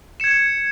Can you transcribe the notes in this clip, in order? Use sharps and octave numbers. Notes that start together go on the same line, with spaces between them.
G#6 C#7 E7